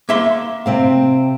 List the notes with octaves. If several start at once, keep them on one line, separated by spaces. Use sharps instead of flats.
A#3 E5 C6
C3 C4 F5